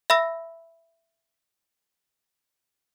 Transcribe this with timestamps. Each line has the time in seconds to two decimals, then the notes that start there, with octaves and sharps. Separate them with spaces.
0.10 E5 B5 E6 A#6